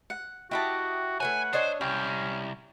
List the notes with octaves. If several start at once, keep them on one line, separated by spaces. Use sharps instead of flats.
F#5
E4 F#4 G4 D#5 E5 A5
A3 B4 C#5 F#5 G#5
D4 A4 C5 C#5 D#5
C2 C#4 G4 G5